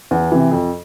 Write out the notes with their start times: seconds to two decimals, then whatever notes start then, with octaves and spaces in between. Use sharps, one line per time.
0.11 E2
0.32 C3 E3
0.52 F2